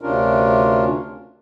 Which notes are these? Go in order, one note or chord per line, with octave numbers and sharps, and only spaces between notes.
D2 C3 C#4 D4 F4 A#4